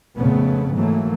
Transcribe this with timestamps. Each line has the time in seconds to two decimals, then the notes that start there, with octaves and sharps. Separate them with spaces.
0.17 F2 A#2 C#3 A3 B3
0.74 G#2 E3 F#3 A3 A#3